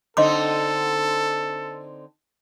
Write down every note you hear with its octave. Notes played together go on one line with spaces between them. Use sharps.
D3 C4 D#4 A4 D#5 C6 D6